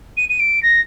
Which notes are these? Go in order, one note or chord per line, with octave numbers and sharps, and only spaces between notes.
D#7
D#7
D7
A#6